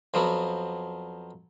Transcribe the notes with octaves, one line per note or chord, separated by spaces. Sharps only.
F2 F3 F#3 B3